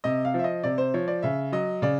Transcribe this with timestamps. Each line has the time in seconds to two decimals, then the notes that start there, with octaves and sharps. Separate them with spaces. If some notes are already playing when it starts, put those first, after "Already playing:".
0.04 C3 D#5
0.25 F5
0.34 F3 E5
0.44 D#5
0.64 C3 D5
0.78 C5
0.94 F3 C#5
1.08 D5
1.23 C#3 E5
1.52 F#3 D#5
1.82 C#3 D5